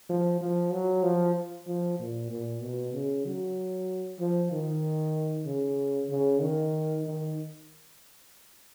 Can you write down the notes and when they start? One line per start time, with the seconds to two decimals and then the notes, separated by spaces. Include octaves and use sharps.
0.09 F3
0.41 F3
0.73 F#3
1.03 F3
1.67 F3
1.99 A#2
2.31 A#2
2.62 B2
2.94 C#3
3.25 F#3
4.20 F3
4.52 D#3
5.46 C#3
6.09 C#3
6.41 D#3
7.05 D#3